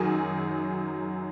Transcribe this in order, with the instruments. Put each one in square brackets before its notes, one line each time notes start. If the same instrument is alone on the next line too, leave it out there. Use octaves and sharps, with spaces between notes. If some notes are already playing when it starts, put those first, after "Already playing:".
Already playing: [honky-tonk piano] F#2 D#3 F#3 G#4